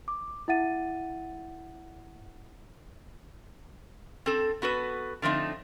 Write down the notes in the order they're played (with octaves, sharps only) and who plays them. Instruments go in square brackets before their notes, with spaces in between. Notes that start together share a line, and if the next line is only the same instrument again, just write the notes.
[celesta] D6
E4 E5 F#5 A6 D#7
[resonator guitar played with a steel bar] C4 A4
B3 F#4 A4 B4
D3 F3 A3 C4 D#4